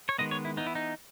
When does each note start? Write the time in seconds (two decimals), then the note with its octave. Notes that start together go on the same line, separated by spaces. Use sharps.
0.09 C#5
0.18 D#3 G#3 B3 D#5
0.31 C#5
0.45 E4
0.57 E3 B3 D#4
0.66 E4
0.75 D#4